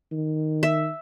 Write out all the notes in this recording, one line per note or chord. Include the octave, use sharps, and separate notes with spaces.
D#3
E5